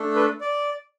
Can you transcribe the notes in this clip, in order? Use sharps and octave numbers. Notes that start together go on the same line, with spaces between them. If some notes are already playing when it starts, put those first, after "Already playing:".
Already playing: A3 D4 A4
B4
D5